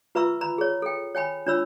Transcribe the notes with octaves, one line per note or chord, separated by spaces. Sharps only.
F4 B4 E5 A#5 C#6 E6
A#5 B5
G#4 C#5
A4 G5
C#5 G5 G#5 B5
D4 F4 C#5 B5 E6